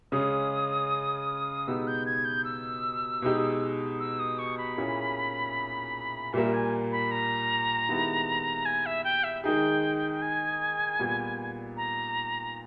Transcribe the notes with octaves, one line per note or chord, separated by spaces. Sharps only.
C#3 G#3 C#4 G#4 D#6
B2 G#3 B3 D#4 G4 E6
G6
G#6
G6
E6
B2 G#3 D#4 G4
E6
D#6
C#6
B5
A#2 A#3 C#4 E4 G#4
A#2 G3 A#3 E5
G#5
B5
A#5
D#3 G#3 B3 E4 G4
G#5
E5
G5
E5
D#3 G#3 D#4 G#4 G5
G#5
A#2 G3 B3
A#5